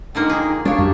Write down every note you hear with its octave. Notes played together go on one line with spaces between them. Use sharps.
D3 F3 A#3 D#4 G5
G#4
G3 D4 C#5 F5 C#6
F#2 A#2 G4